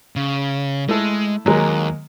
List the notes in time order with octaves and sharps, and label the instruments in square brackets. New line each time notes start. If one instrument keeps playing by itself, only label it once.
[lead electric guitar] C#3
[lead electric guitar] G#3 [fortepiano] A3 E4 A4
[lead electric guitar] D#2 G#2 [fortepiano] F#3 G#3 A#3